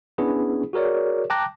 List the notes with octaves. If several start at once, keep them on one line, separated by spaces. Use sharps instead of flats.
B3 C#4 D4 E4 G#4 B4
F#4 G#4 A#4 C#5 D5
G5 A5 A#5 D6 F#6 A#6